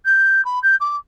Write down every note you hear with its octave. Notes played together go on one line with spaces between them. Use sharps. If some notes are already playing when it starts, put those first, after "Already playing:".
G6
B5
G6
D6